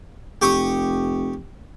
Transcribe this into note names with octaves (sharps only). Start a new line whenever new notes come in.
F1 G4 C#6 D#6